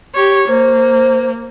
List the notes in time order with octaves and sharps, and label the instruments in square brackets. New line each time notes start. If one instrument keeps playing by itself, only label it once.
[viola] G4 C#5
[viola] A#3 [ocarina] C5